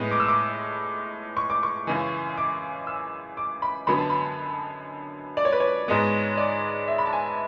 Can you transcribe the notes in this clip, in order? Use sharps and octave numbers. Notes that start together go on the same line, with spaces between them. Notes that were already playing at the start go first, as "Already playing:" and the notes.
Already playing: A2 G#3 B3
D6
E6
D6
C#6
D6
C#6
F#2 C#3 E3
D6
E6
D6
B5
F#2 D3 F#3 B3 B5
A5
B5
D5
C#5
B4
C#5
G#2 G#3 B3
D5
E5
B5
A5
G#5